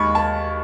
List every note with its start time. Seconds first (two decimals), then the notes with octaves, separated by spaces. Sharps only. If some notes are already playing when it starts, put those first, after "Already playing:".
Already playing: D#2 D#3 G#3 B5 C#6
0.15 A5